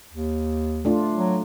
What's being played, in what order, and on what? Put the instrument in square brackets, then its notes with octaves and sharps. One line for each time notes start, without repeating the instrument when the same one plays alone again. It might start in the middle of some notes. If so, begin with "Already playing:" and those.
[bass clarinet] D#2
[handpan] A3 D4 F4
[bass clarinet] F#3